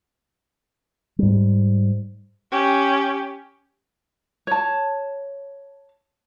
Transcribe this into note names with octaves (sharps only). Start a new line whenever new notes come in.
G#2 G3
C#4 G4
C#5 A5